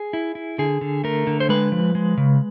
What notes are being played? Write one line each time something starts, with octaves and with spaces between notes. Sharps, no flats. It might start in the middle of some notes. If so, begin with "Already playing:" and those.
Already playing: G#4
E4
E4
D3 G#4
D3
A3 A#4
D3
C5
G#3 B4
F3
G#3
C#3